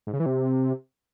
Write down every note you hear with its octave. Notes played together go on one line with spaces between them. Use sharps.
G#2
C#3
E3
C3